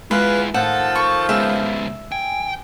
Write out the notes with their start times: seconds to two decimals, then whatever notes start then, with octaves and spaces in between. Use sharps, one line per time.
0.11 G#3 E4 F4 G#4 B4
0.54 A2 D#3 F3 F4 A4 F#5
0.95 C#6
1.29 C#3 G#3 B3 E5
2.12 G5 G#5